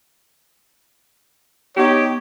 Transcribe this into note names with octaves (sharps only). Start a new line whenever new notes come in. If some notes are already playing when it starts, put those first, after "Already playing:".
B3 D#4 G4 C#5